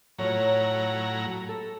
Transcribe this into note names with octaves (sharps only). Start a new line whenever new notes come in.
A2 F#3 F4 C#5 A#5
A4